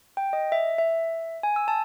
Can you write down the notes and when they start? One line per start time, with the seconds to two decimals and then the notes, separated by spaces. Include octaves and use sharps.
0.17 G5
0.33 D#5
0.52 E5
0.78 E5
1.43 G#5
1.56 E6
1.68 A5